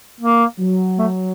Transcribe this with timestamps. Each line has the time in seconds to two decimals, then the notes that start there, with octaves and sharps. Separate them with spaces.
0.21 A#3
0.59 F#3
0.98 A3